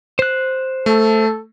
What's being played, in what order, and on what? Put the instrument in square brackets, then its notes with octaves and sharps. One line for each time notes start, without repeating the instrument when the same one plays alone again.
[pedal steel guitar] C5 F#6
[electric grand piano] A3 [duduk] A4